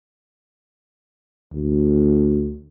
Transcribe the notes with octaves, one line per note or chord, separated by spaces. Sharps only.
D2